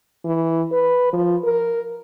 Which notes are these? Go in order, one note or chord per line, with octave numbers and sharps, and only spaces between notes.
E3
B4
F3
A#4